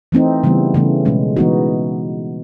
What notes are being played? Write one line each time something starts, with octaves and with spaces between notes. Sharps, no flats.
E3 A3 C4 D#4
C#3 E3 G3 B3
C#3 E3 A3
B2 G#3 C#4
E3 G#3 B3 D#4 F#4